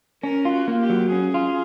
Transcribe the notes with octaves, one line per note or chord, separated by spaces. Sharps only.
C#4 A#4
F4
F#4
A#3
G4
F#3
C#4 G#4
F4